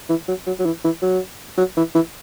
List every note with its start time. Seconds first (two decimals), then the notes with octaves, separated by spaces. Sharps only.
0.09 E3
0.28 F#3
0.47 F#3
0.59 F#3
0.66 E3
0.85 E3
1.02 F#3
1.58 F#3
1.77 E3
1.95 E3